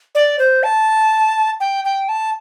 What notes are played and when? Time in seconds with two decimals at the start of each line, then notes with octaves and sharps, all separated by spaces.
0.15 D5
0.39 C5
0.63 A5
1.60 G5
1.85 G5
2.09 A5